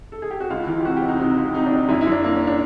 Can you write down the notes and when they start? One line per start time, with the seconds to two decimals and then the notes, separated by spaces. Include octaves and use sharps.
0.12 A4
0.22 G#4
0.31 G4
0.40 F#4
0.50 C#2 F4
0.67 E3
0.80 G4
0.85 C3 F#4
0.97 G4
1.02 C3
1.09 D#4
1.20 C3 D#4
1.37 C#2
1.54 C3 D#4
1.66 D4
1.72 C3
1.77 D#4
1.89 F#2 E4
2.01 E4
2.07 F#2 D4
2.24 A#3
2.36 C#4
2.47 D4